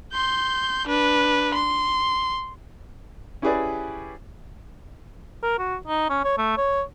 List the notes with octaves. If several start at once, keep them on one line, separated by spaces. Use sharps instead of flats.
C6 G6
D4 B4
C6
C#4 E4 G4 G#4 B4 D5
A#4
F#4
D#4
C#4
C#5
A3
C#5